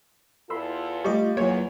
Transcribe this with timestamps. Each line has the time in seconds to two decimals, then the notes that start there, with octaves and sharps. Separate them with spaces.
0.50 E2 E4 F4 A4 B5 C6 E6
1.04 G3 A3 D#5 C#6
1.37 E2 F#3 A#3 C#5